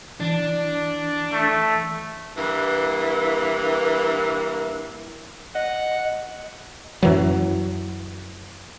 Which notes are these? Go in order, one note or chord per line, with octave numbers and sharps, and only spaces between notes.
E3 D4 D5
A3
G2 E3 A#3
D#5 F#5
F#2 E3 F#3